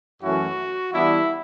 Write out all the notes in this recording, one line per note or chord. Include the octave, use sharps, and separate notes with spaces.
F#2 E3 A3 C#4 E4 F#4
E3 G3 B3 D4 E4